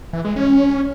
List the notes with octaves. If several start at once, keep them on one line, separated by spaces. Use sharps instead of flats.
E3
G#3
C#4